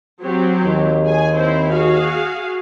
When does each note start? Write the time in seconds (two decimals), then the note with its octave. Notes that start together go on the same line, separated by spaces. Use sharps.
0.22 F#3 C4 G4
0.63 D#2
1.04 G#4 G#5
1.34 C4 E4 C5
1.70 F#4 G#4 F5